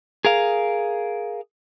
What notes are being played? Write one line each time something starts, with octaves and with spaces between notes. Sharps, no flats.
G#4 A#4 F5